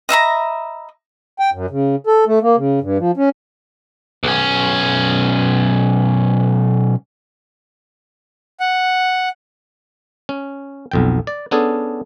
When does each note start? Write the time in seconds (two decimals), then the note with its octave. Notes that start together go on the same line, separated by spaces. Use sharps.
0.09 D#5 E5 A#5 B5
1.39 G5
1.53 F#2
1.70 C#3
2.07 A4
2.27 A3
2.42 A#3
2.56 C#3
2.81 G2
2.98 F3
3.17 C#4
4.23 B1 C#4
8.60 F#5
10.29 C#4
10.91 B1 F2 G5
11.27 D5
11.51 B3 C#4 D4 G#4 A4